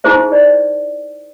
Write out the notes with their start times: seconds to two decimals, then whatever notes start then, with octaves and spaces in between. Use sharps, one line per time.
0.04 D#4 E4 G4 G#4 C5 E5
0.32 D5